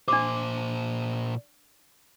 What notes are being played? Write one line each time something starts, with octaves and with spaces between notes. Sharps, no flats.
A#2 D4 C5 D6